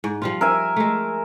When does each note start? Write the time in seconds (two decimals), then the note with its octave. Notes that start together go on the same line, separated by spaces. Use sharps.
0.04 G#2
0.22 F3 G3 F4
0.41 A#4 E5 G#5
0.76 G#3 A3